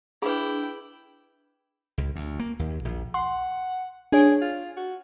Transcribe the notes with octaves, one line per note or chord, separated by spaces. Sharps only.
D4 E4 G#4 B4 G5
C#2
D2
A#3
D#2
A#1
F#5 C6
D4 G#4 C#5
F4
F#4